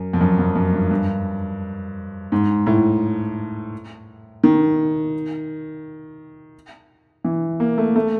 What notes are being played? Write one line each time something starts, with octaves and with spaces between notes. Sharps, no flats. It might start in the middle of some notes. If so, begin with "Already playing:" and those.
Already playing: F#2
F2
F#2
F2
F#2
G2
G2
G#2
A2
D#3
E3
A#3
A3
A3